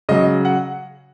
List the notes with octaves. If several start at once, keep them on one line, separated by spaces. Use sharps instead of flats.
C#3 F#3 D#5
F#5